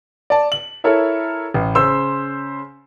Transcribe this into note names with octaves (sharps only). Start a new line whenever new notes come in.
D5 A5
F#7
E4 A4 A#4 C#5 E5
A1
C#3 C5 C6 E6 E7